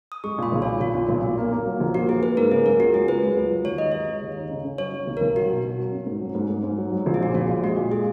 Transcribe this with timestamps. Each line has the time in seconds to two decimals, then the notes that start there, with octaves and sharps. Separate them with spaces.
0.12 D#6
0.24 G#3 C#6
0.38 A#2 B5
0.52 B1
0.62 C#5
0.67 A#2
0.80 B1 F4
0.95 A#2
1.09 B1
1.23 A#2
1.38 A#3
1.52 A#3
1.66 F#3
1.80 A#1
1.94 A#3 F#4
2.09 A#3 G#4
2.23 A#3 B4
2.37 G#2 A#4
2.51 C#3 G#4
2.65 F#3 A#4
2.80 C#2 F#4
2.94 F#3 G#4
3.08 C#2 B4
3.23 C#2
3.37 C#2
3.50 F#3
3.65 D#2 C#5
3.78 D#4 D#5
3.92 G#3 C#5
4.08 G#3
4.22 D#2
4.36 D#4
4.51 C#3
4.65 C#3
4.78 F#3 C#5
4.93 F#3
5.07 B1
5.17 A#4
5.21 B1
5.36 F#3 F#4
5.50 B2
5.64 B2
5.78 F#3
5.92 C#4
6.07 G#2
6.21 F#3
6.35 G#2
6.50 G#2
6.64 G#2
6.78 F#3
6.92 F#3
7.06 A#1 F#4
7.14 G#4
7.20 A#2 F#4
7.34 A#1 F4
7.49 A#2
7.63 G#3 F#4
7.77 A#2
7.92 G#3 G#4